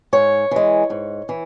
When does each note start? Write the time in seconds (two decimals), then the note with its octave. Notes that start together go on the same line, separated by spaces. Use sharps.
0.13 G#2 C#5
0.51 E3 G#3
0.90 G#2
1.29 E3